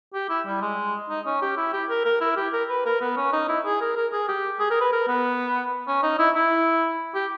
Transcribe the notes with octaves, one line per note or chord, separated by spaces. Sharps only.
G4
E4
G3
G#3
D#4
C#4
G4
E4
G4
A#4
A#4
E4
G4
A#4
B4
A#4
B3
C#4
D#4
E4
G#4
A#4
A#4
G#4
G4
G#4
A#4
B4
A#4
B3
C#4
D#4
E4
E4
G4